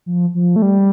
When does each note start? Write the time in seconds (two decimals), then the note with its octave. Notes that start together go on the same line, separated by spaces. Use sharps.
0.06 F3
0.34 F3
0.56 A3
0.62 G3